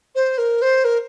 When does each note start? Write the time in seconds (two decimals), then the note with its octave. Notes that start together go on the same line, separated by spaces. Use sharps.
0.15 C5
0.38 A#4
0.62 C5
0.85 A#4